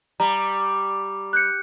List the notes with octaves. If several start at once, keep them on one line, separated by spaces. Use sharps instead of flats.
G3 A#5
F#6 G6 C#7